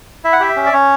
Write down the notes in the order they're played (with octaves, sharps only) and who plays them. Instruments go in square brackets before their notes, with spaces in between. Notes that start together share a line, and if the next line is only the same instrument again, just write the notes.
[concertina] E4 E5
F#5
G4 E5
C#4
D5
C#4 C#5